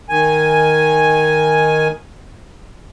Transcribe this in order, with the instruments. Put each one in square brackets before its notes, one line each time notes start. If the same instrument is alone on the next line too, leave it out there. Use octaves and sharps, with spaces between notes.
[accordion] D#3 G#5